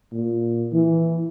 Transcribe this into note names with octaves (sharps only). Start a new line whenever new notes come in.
A#2
E3